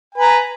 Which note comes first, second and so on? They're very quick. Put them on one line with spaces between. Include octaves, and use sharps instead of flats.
G#5 B4 A#5